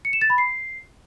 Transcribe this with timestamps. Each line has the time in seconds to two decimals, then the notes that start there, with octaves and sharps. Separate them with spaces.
0.05 C#7
0.13 E7
0.21 A6
0.30 B5
0.38 C7